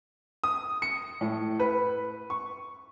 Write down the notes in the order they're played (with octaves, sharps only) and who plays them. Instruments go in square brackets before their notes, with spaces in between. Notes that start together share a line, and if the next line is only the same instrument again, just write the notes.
[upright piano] D#6
C#7
A2
B4
C#6